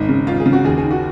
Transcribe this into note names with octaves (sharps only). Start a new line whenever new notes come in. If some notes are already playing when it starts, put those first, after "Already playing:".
Already playing: G#1 D#4
C#3
G#1 F4
G#4
C#3
F#4
D#2 G#4
G#4
D#3
F#4